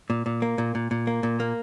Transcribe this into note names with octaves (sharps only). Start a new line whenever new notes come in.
A#2
A#2
A#3
A#2
A#2
A#2
A#3
A#2
A#3